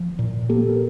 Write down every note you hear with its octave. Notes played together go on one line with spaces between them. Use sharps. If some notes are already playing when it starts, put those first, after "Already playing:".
Already playing: F3
A#2
A#3 G4 A4
A#4